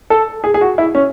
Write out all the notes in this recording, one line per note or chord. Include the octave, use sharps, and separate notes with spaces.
A4
G#4
G#4
F#4
E4
C#4